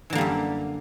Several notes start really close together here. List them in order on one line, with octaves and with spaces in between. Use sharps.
E3 D3 A#3 G3 F#2